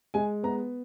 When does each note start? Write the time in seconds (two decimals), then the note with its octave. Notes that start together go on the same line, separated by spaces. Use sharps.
0.14 G#3 G#5
0.43 B3 A#5